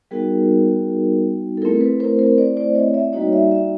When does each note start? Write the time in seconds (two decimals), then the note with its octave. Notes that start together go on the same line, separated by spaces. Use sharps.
0.11 G3 B3 D#4 F#4 G#4 A#4
1.57 A4
1.62 A3 C4 E4 G#4 A#4
1.81 A4 B4
2.00 A#4 C5
2.19 A#4 C5
2.38 C5 D5
2.57 C5 D5
2.75 C#5 D#5
2.94 D5 E5
3.13 G3 A#3 D#4 F#4 C#5 D#5
3.33 D5 E5
3.52 D5 E5